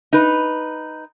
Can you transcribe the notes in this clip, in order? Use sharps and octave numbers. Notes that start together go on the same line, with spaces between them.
D#4 B4